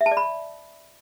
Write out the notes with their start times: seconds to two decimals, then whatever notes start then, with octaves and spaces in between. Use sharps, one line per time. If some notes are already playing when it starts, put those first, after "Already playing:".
0.01 E5
0.06 A5
0.11 D5
0.17 B5